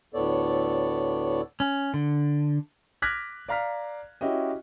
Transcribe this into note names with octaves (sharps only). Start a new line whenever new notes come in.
D2 A2 B3 A4 C#5 D5
C#4
D3
D6 F6 F#6 G#6 A#6 B6
D5 F5 A#5 F6 B6
C#4 E4 F#4 G4 D#5